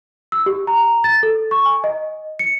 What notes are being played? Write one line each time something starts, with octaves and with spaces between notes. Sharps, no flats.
E6
G4
A#5
A6
A4
C#6
G#5
D#5
C#7